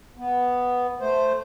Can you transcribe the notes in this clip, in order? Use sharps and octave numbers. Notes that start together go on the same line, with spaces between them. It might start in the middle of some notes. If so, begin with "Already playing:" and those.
B3
A3 C5